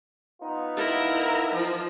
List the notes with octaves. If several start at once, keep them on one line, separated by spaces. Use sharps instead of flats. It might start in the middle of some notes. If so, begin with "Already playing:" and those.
B3 D#4 F4
E4 A#4
F3